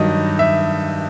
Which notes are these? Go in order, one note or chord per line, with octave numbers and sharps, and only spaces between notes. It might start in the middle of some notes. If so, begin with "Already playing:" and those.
Already playing: G2 D#3 F#3 D#5
E5